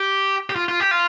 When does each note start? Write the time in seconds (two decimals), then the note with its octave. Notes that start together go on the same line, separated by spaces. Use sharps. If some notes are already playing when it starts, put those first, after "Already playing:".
Already playing: G4
0.50 G4
0.56 F4
0.68 F4
0.80 G4
0.91 F4